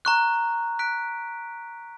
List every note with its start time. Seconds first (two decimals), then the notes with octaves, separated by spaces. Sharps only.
0.05 A#5 C#6 F#6
0.79 F#6 B6 D7